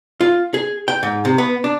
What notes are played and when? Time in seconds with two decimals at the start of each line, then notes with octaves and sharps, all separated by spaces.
0.21 F4
0.54 G#4
0.88 G5
1.03 G#2
1.25 C3
1.38 B3
1.64 D4